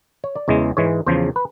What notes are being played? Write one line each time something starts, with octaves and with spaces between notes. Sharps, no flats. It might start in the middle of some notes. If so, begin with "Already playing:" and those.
C#5
D5
E2 C#3 E3 G#3 D#5
G#2 E3 G#3 C#5
E2 C#3 F3 C5
B4